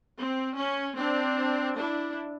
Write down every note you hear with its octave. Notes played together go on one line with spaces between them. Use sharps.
C4
C#4
C4 D4
D4 E4